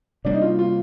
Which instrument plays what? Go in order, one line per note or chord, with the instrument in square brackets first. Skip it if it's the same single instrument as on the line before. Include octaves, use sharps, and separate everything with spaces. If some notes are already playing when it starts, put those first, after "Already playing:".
[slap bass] C3 G3 A#3 [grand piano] D4
[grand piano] D#4
F4
F4